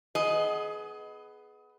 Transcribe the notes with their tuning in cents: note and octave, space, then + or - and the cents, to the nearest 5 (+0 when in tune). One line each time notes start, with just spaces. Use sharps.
B3 +10 G#4 +25 D#5 +0